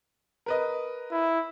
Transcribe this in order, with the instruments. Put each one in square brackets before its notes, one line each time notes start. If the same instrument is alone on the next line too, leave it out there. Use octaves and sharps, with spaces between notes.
[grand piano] A#4 B4 D#5
[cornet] E4